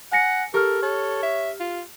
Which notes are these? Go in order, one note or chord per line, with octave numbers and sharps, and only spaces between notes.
F#5 G#5 A#6 C#7
G4 A4 A#4 F6
A4 C#5
E5
F4